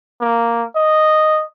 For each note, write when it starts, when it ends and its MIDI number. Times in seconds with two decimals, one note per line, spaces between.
0.21 0.63 58
0.76 1.44 75